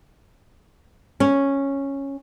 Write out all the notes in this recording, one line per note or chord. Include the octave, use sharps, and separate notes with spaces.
C#4